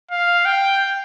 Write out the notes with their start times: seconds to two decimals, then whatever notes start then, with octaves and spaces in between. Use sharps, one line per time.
0.11 F5
0.46 G5